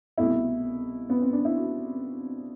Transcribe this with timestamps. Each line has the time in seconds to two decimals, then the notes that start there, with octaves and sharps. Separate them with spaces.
0.18 C2 B2 A3 E4
1.10 B3
1.22 C4
1.33 D4
1.45 E4
1.57 F#4